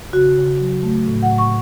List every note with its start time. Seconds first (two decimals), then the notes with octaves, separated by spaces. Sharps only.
0.13 C#3 F#4
0.37 C#3
0.60 F#3
0.83 A3
1.08 A2
1.22 F#5
1.31 A2
1.38 C#6